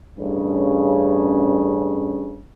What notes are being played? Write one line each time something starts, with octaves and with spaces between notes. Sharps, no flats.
A1 G2 C#3